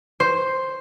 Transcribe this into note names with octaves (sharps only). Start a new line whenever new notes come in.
C5